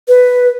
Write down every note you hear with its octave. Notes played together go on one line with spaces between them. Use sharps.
B4